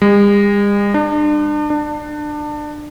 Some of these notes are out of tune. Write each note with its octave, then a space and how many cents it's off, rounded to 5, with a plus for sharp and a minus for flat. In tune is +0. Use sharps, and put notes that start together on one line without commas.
G#3 -45
D4 +35
D4 +25